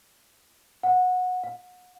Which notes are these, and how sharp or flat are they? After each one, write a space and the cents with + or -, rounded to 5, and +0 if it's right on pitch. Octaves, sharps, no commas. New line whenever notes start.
F#5 -20
F#5 -35